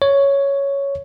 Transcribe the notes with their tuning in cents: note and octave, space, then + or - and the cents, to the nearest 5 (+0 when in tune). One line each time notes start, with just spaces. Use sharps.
C#5 +5